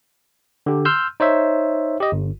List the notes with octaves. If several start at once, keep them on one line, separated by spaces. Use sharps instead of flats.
D3 G4
C6 E6 F6 G6
D#4 C5 C#5 E5
G4 D#5
G1